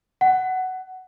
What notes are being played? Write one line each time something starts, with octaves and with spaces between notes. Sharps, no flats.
F#5